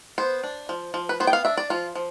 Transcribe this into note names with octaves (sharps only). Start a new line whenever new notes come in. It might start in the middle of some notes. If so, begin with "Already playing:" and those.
B3 C5
D4
F3
F3
B4
B3 C5
G5
F5
D4 E5
D5
F3 F4
F3